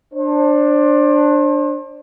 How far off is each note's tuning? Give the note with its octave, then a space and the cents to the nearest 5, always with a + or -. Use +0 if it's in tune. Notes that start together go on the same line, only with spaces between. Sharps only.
D4 +10 C5 +35